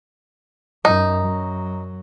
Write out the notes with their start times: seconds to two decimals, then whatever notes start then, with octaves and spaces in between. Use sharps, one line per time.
0.85 F#2 D#4
1.22 F#2 F#3